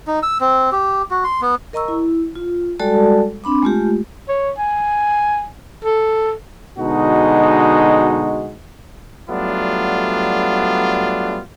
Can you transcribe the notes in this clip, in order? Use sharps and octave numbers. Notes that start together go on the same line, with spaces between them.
D#4
E6
C4
G4
F#4
C6
B3
A#4 D#5 A#5 C#6 E6
E4
F4
G3 G#3 F#4 A4 D5 A5
C4 D4 B5 D6
G#3 A3 F4 G4
C#5
G#5
A4
B2 D3 G#3 D#4 F#4
F#3 G3 A3 B3 D4 F4